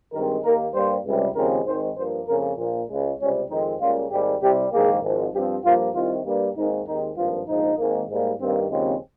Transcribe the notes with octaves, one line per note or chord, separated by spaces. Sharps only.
G2 D#3 G#3 C4 A#4
D#2 D#3 A#3 A#4
G2 G3 A#3 C5
C#2 C3 G3
D#2 C#3 F3 G#3 C4 A#4
G#1 G#2 D#3 G#3 C5
G2 F3 A#3 C5
F2 C#3 F3 A#3 A#4
A#1 A#2 F3 A#3
C#2 C#3 G#3
C#2 C3 G3 C4 C#4
F2 D#3 G#3 C4 D#4
C#2 C#3 G3 A#3 F4
G#1 G#2 G3 A#3 G4
C2 C3 G3 G4
A#1 G#2 D#3 A#3 G#4
G#1 G#2 F3
G2 F3 C4 G4
G2 F3 A#3 F4
C2 C3 D#3 F4
G2 G3 A#3
G#1 G#2 D#3 A#3 D#4
D#2 D#3 G#3 C4 D#4
G#1 G2 F3 A#3 F4
A#1 G#2 F3 D#4
G#1 G#2 D#3 A#3
G#2 G3 A#3
G2 D#3 A#3 C4
D#2 C#3 F3 G#3 C4